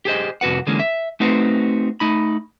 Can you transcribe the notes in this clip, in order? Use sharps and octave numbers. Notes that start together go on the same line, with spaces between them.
G4 G#4 C5 D#5
C2 F2 F#4 B4 F#5
D3 E3 G#3 A#3 C#4
E5
A3 C4 D#4 F#4 B4 C5
A3 D#4 B5